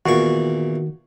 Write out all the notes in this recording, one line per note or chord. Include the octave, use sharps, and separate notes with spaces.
E2 A#2 D#3 F#4 C#6